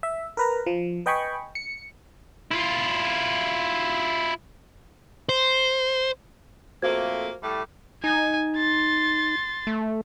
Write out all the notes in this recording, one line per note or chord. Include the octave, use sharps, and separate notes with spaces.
E5
A#4 B4 A#5
F3
B4 D#5 G5 G#5 B5 C#6
C#7
E4 F4
C5
F2 A3 A#3 F#4 C5 G#6
A2 G3 A3
D#4 G#5
C6 A6
A3